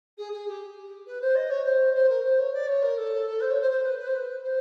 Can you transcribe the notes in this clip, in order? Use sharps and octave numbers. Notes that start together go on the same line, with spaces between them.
G#4
G#4
G4
B4
C5
D#5
C#5
C5
C5
A#4
C5
C#5
D5
C#5
A#4
A4
C5
C#5
C5
C5
B4
B4
C5
B4
C5